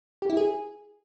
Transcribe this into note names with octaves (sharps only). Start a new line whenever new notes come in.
G4
E4
G#4